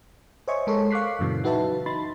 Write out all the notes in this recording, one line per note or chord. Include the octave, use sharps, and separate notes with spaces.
C5 C#5 D#5 E5 G#5 C#6
G#3 A4 A#4 C#5 C6
F5 C#6 D6 F#6 B6 C7
F#2 A#2 C#3 E3 F#3
D#4 F#4 B4 E5 A5
D#4 B5 C6 A6